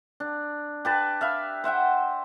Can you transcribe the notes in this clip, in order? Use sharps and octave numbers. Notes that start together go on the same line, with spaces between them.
D4
G4 B4 A5
E5 F5 B5
C5 E5 F#5 G5